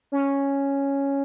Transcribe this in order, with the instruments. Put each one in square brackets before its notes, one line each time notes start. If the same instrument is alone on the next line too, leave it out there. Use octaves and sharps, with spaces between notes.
[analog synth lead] C#4